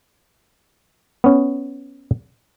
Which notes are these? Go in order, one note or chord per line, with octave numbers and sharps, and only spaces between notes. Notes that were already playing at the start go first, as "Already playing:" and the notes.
B3 C#4